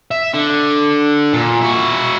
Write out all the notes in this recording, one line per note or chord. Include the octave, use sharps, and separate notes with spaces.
E5
D3
A#2
E4 F#4